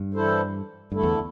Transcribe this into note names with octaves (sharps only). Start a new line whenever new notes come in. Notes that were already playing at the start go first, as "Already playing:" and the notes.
Already playing: G2
E3 G3 E4 A4 C5
G2 D3 A3 E4 A4
E2